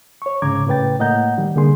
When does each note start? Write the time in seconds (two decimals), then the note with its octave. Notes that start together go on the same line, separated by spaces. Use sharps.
0.22 C#5 C#6
0.42 C2 G#2 C#3 A#5 D6 G#6
0.67 A2 C#3 B4 G5 A6
0.99 A2 A#3 D#5 F#5 A#5 G6
1.38 D#3 G3
1.55 C2 D3 A#3 G#4 C6